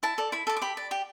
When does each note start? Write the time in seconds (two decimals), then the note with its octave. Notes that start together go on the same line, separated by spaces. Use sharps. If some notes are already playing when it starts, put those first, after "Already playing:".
0.03 E4 A5
0.18 A4 D5
0.32 E4 B5
0.47 A4 D5
0.57 D6
0.62 G4 B5
0.77 D5
0.91 G4 G5